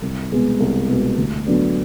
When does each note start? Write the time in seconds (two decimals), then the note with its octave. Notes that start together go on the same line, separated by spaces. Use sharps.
0.02 C2
0.31 B2 G#3 B3
0.60 C2
0.89 B2 G#3 B3
1.18 D2
1.47 D3 F#3 B3 D4